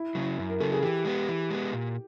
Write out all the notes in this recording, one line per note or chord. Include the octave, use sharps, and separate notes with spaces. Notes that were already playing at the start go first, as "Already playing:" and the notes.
Already playing: E4
C#3 F#3
F#2
A#4
C#3 F#3 A4
G#4
E3 G4
G#3 B3
E3
G#3 B3
A#2